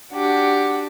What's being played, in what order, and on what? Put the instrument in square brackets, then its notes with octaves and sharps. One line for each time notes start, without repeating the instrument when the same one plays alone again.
[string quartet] D4 F#4 G4